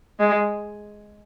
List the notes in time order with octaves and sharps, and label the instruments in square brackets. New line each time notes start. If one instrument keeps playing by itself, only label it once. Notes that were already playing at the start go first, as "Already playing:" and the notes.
[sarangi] G#3